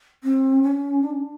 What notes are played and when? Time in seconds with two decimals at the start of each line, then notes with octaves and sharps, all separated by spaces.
0.24 C4
0.63 C#4
1.02 D4
1.10 C#4
1.19 D4